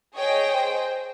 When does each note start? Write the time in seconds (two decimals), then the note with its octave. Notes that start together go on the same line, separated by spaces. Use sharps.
0.15 G#4 C#5 D#5 G5
0.54 C5